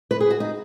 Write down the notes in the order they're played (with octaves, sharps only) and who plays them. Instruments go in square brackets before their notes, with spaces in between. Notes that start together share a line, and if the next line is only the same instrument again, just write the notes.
[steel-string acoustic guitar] B4
G#4
F#4
D#4